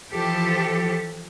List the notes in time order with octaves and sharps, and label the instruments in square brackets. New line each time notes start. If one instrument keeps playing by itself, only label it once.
[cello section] E3 F3 G4 A4